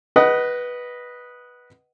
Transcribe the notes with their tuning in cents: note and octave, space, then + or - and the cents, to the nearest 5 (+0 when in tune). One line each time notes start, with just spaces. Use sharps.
B4 -10 D#5 +0 F#5 +25